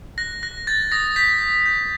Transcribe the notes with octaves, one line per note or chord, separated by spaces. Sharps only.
F#6 A#6
F#6 A#6
G6 A6
D#6 A#6
G6 B6
D#6
G6